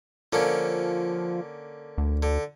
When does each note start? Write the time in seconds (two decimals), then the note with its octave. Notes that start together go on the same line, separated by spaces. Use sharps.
0.33 D3 F3 A#3 C#4
1.98 D2
2.23 D3